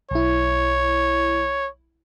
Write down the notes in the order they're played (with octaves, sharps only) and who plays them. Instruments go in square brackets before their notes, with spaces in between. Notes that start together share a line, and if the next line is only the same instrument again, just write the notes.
[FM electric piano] B1 E4 [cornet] C#5